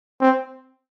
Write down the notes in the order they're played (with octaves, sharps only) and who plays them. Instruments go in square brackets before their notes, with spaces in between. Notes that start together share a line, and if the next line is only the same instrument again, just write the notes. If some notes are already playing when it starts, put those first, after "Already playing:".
[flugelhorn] C4